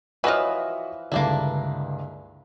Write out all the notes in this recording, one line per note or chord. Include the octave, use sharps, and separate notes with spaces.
E3 F3 F#4 B4 C#5 D#5 B5
C#2 G2 D3 A#3 D4 E4